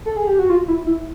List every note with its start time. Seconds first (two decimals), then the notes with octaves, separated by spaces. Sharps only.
0.06 A4
0.17 G#4
0.27 G4
0.39 F#4
0.50 F4
0.68 E4
0.86 E4